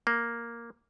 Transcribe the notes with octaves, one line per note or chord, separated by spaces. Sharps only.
A#3